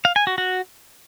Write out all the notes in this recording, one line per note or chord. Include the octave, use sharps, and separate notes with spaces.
F5
G#5
F#4
F#4